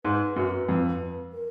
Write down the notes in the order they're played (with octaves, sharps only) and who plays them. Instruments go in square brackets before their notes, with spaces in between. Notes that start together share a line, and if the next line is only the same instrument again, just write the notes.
[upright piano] G#2 [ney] B4
[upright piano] F#2
F2
[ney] A#4